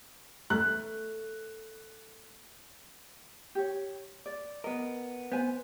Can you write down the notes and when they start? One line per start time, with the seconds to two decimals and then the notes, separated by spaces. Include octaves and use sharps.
0.50 A3 F#6
3.55 G4 C#5
4.26 D5
4.64 B3 A#4 D#5
5.32 B3 C5 G#5